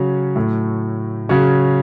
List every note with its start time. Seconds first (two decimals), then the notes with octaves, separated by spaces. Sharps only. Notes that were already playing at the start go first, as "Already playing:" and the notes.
Already playing: C#3 F#3 C#4 F#4
0.36 A2 F#3 A3
1.29 C#3 F#3 C#4 F#4